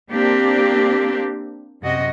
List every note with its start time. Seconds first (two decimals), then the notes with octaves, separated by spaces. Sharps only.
0.11 A#3 C4 D4 G4
1.81 F#2 C3 F#4 D#5